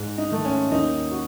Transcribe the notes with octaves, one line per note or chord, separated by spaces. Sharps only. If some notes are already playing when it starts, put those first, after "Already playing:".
Already playing: G#2
D#4
D#3 A3
C#4
D#2 D#4
F#4